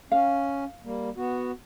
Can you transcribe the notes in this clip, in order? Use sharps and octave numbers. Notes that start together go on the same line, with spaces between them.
C#4 F5
G3 A#3
B3 F#4